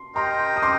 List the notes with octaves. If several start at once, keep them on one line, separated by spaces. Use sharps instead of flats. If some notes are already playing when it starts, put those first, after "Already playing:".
Already playing: C6
G4 A#4 D#5 G5 A#5 C6
D#6
C6 D6